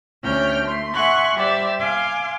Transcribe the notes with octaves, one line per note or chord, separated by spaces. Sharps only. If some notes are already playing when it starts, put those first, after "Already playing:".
D2 C#4 G5 F6
A3 C6
E5 F#5 G#5 C6 C#6 F#6
G3 G4 C5 D5 E5
F5 G#5 C6 D6